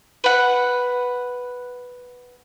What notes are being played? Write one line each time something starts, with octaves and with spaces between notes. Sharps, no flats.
B4 F#5